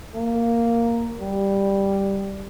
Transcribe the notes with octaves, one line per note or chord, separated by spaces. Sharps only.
A#3
G3